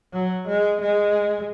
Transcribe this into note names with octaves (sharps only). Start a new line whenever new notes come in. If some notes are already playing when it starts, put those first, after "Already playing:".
F#3
G#3
G#3